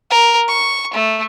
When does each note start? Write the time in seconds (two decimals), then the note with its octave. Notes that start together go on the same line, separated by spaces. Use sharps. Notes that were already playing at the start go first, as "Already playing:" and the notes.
0.10 A#4
0.48 C#6
0.94 A3